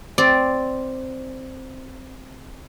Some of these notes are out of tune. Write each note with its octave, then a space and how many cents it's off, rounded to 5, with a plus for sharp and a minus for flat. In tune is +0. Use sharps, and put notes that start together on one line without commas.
C4 +0 D5 +0